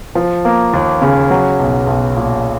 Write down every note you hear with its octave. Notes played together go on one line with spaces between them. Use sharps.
F3
A#3
D#2
C#3
F#3
B1
B1
A#2